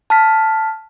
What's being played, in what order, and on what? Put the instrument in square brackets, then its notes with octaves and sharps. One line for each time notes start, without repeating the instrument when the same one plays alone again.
[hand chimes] A5 F6 B6